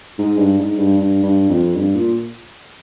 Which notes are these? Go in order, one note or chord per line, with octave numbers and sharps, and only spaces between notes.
G#2
G2
G#2
G2
G2
G2
F2
G2
A#2